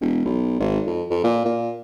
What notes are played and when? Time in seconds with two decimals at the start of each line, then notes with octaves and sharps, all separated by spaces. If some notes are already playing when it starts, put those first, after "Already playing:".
0.01 E1
0.25 B1
0.60 G#1
0.87 F2
1.10 F2
1.24 A#2
1.45 A#2